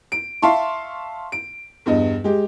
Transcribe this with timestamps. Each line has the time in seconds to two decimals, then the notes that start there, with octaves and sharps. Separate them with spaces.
0.12 D7
0.42 E5 F5 A5 C6 C#6
1.32 D7
1.86 E2 G2 D#5
2.24 G#3 G4